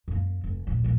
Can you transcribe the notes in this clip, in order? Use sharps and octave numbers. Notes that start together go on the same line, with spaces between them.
F#2 A#3
F1
A#1 E2
A#1 D#2